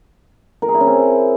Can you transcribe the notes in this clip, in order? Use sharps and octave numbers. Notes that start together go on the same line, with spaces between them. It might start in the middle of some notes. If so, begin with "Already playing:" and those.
A#4
G#4
E4
C#4
C4